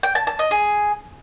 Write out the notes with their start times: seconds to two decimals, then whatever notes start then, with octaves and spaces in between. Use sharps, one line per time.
0.03 G5
0.15 A5
0.27 A5
0.39 D#5
0.51 G#4